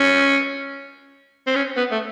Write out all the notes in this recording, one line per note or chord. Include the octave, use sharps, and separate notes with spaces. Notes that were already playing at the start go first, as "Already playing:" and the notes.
Already playing: C#4
C4
C#4
B3
A3